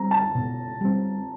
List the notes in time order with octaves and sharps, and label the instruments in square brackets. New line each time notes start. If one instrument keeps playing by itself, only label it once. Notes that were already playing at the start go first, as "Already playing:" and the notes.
Already playing: [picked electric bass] G3 C4 [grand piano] A#5
[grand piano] A5
[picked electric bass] B2
G3 C4